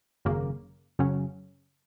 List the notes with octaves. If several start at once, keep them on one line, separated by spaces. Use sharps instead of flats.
G#1 F#2 C#3 A#3
F#2 C#3 F#3 C#4